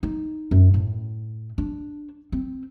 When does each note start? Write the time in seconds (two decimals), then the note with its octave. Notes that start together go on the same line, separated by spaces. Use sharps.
0.03 D#4
0.51 F#2
0.74 A2
1.58 D4
2.32 C4